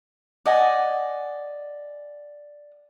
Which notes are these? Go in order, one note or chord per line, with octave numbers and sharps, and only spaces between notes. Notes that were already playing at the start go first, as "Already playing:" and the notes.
D5 D#5 F#5 G#5